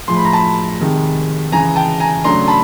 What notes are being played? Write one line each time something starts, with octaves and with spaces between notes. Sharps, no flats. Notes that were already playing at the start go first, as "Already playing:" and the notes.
A2 F3 G#3 C6
B5
A#5
A5 B5
C3 D#3 G#3
C#3 E3 G#3 G#5 A#5
G5 A5
G#5 A#5
C#3 F#3 A3 D4 A#5 C6
A5 B5